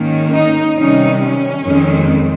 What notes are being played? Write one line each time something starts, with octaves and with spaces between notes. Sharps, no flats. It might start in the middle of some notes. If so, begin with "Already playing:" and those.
Already playing: G#2 D#3 A#3 C#4
D#4
C3 D#3 G3 C#4 D#4
C#4
F2 D#3 G#3 C4